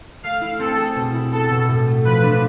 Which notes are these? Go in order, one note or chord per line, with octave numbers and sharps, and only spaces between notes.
A3 F5
E4
C4 A4
G#4
B2
E4
B3 A4
B2
A2
A3
F3 B4
D4